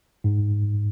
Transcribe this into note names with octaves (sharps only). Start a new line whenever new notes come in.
G#2